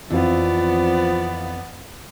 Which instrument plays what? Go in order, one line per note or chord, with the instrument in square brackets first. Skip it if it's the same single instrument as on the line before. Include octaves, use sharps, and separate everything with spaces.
[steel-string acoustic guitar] F2 [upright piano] E3 C4 F4 [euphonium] F3 [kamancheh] B3 D5